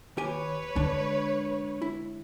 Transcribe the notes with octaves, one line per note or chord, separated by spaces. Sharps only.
D#2 G4 B4 C#5 G#5
D3 G#3 D4
E4